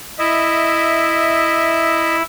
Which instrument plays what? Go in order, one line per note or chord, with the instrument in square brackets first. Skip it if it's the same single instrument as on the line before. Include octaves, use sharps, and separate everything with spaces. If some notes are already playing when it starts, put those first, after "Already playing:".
[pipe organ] E4 [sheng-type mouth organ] D#5 E5